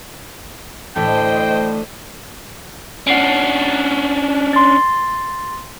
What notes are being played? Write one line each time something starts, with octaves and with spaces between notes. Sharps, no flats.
A2 D3 E3 A3 A4 C5 D#5 G5
C#4 D4 F#5 C7 D7
C6 A6